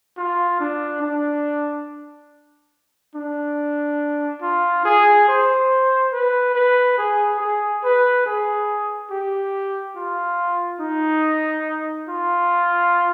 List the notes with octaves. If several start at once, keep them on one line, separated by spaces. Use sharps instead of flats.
F4
D4
D4
D4
F4
G#4
C5
B4
B4
G#4
G#4
B4
G#4
G4
F4
D#4
F4